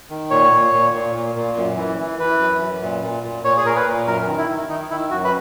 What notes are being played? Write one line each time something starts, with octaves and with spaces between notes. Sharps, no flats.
D#3
A#2 C#5
A#2
A#2
A#2
A#2
A#2
F#2
E3
E3
E3 B4
F#2
F#2
A#2
A#2
A#2
A#2 C#5
G#4
A#2 A#4
B4
A#2
F#2 A#4
D#3
E4
D#3
D#3 D#4
D#3 E4
F#2 F#4
B4